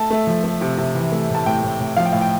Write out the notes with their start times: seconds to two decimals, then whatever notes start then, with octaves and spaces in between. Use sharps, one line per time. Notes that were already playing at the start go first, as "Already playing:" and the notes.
Already playing: A3 A5
0.11 A3
0.27 F3
0.44 A3
0.61 C3
0.78 C3
0.95 E3
1.12 A3
1.30 A2
1.35 A5
1.46 A2 G5
1.63 A2
1.80 A2
1.97 F3 F5
2.05 G5
2.12 A2 F5
2.21 G5